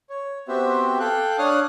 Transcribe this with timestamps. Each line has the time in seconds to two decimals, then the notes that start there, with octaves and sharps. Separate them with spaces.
0.10 C#5
0.48 B3 C4 F#4 G4 C5 E5
1.00 A4 F5 G5 F#6
1.39 D4 C#5 F5 D#6 F6 F#6